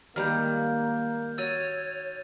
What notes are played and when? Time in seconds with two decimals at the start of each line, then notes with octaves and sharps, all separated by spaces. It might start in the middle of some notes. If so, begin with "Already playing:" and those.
0.16 D#3 G3 G#3 A#3 F6 G6
1.38 F#4 C#5 E6 A6 D#7